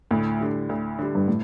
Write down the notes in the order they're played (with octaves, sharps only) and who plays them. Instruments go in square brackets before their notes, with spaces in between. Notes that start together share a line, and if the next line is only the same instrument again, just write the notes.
[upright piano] D2 [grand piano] A2
[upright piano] D3 G3
D2
D3 G3
[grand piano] G2
A2